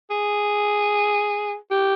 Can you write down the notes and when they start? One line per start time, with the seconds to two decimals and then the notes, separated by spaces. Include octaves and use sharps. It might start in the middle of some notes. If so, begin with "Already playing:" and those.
0.10 G#4
1.71 G4